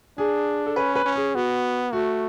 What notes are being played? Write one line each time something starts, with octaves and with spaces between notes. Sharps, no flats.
D4 G#4
A4
C#4 B4
B4
C#4
G#4
B3 F#4
A3 F#4